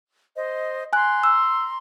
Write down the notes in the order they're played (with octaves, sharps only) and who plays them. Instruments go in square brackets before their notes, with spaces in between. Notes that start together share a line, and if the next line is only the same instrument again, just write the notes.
[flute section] C5 D#5
[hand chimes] G#5 F#6 [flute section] A#5 C6
[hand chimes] E6